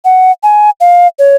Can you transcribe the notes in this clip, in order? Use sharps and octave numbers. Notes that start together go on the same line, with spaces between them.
F#5
G#5
F5
C#5